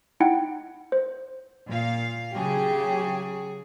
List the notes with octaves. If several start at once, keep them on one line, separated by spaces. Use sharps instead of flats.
D#4 E4 F#5 G5
C5
A#2 F5
C#3 F#3 G4 G#4